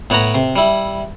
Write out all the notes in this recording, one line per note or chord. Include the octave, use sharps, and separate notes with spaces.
A2 B3 C#5 F#5 A#5 B5
C3
G3 E4